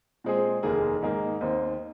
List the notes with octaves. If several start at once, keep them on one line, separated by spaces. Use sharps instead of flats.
A#2 G#3 C4 G#4
F1 D#2 D#3 A#3 G#4
G#2 D#3 A#3 D#4 G#4
D#2 D#3 C4 D#4